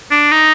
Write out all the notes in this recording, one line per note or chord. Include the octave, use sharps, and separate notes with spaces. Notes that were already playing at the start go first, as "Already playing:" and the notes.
D4
D#4